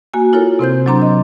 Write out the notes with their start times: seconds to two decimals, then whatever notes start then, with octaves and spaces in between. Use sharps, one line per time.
0.14 A#3 F#4 G#5
0.33 E4 F4 A4 A#4 C#5
0.59 C3 C4 C5 G6
0.86 F#3 C4 D4 A#5 C6
1.02 D#5